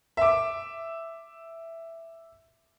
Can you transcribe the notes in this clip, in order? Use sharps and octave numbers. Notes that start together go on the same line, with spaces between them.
E5 D6